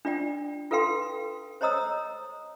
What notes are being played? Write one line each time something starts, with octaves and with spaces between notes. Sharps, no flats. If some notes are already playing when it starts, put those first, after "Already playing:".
D4 F4 D5 G5
F4 A4 B4 F5 G5 C6
C5 C#5 D#5 A#5 D#6 E6